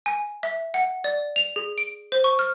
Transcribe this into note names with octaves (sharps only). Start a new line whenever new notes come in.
G#5
E5
F#5
D5
F7
G#4
D7
C5
C#6
F6